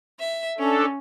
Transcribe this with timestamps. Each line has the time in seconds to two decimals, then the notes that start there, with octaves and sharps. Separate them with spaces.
0.21 E5
0.58 C#4 D4 A4